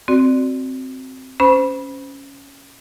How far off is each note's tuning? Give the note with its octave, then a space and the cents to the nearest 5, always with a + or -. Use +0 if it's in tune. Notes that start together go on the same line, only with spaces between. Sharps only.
C4 +0 F#4 +0 D5 +0
C#4 +0 C5 -30 B5 -20